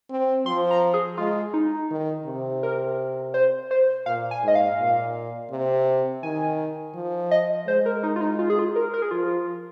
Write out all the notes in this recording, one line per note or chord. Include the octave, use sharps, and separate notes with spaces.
C4
F3 C6
A#5
G#4
G#3 F4
D#4
D#3
C3
A#4
C5
C5
A#2 F5
G#5
G#2 D#5
F5
A#2
C3
D#3 G#5
F3
D#5
G#3 C5
A#4
D#4
F4
D#4
F4
G#4
F4
A#4
A#4
G#4
F3 F4